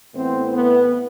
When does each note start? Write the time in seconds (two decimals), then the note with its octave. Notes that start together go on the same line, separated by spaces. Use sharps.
0.15 A2 E3 B3 C4
0.53 B3